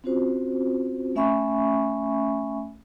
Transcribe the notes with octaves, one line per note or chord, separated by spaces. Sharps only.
C4 C#4 F4 F#4 C5
A3 C#4 E5 G#5 B5 C#6